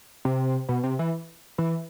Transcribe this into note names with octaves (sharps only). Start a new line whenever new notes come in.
C3
B2
C3
E3
E3